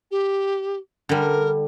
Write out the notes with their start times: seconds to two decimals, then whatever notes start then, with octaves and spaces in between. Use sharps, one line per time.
0.11 G4
1.09 D3 G3 A#4